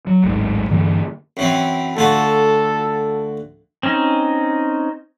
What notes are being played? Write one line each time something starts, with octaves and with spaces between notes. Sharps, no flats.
F#3
D1 G#1 G#2 G#3
G2 D3 E3 A#3
F#2 E3 C4
D2 F4 F#4 A4
C4 C#4 D#4